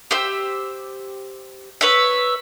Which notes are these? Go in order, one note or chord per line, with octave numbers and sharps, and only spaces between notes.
G4 C5 E5 E6
B4 C#5 E5